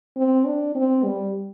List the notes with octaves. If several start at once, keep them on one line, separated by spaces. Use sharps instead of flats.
C4
D4
C4
G3